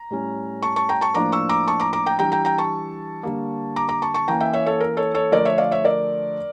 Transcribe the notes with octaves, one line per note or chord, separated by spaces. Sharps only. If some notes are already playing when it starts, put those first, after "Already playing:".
Already playing: A#5
A2 G3 C#4
A5 C#6
A5 C#6
G5 A#5
A5 C#6
A2 F3 A#3 D4 A#5 D6
C#6 E6
A#5 D6
A5 C#6
A#5 D6
A#5 D6
G5 A#5
E3 G3 D4 G5 A#5
G5 A#5
G5 A#5
A5 C#6
D3 G3 A#3
A#5 D6
A#5 D6
A5 C#6
A5 C#6
E3 A#3 C#4 G5 A#5
E5 G5
C#5 E5
A4 C#5
A#4
A4 C#5
A4 C#5
D3 F3 A3 D4 A#4 D5
C#5 E5
D5 F5
C#5 E5
A#4 D5